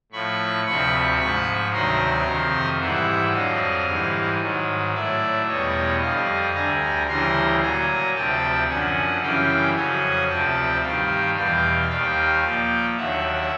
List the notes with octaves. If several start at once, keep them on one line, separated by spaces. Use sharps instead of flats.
A2 F3 B5 C#6
D2 C3 F3 B5 C#6
G#2 F3 B5 C#6
D2 C3 D#3 F#3 A#5 C6
F2 C3 D#3
G#2 E3 G3 E5 F#5
F2 D3 F#3 D#5 F5
G#2 E3 G3
G#2 D#3 F#3
A2 F#3 D5 E5
E2 B2 G3 C#5 D#5
F2 D3 G3 D#5 F5
D2 D3 G3 G#5 A#5
D2 C#3 E3 G3 A#5 C6
A#2 F#3 G#5 A#5
D2 C3 F3 G5 A5
F#2 D3 F3 F#5 G#5
F#2 C#3 E3 G3 F5 G5
F2 C#3 F#3 F#5 G#5
D2 C3 F3 G5 A5
G2 D#3 G3 F5 G5
E2 B2 G3 F5 G5
D#2 D#3 G3 F5 G5
A#2 F3
D#2 D3 F#3 E5 F#5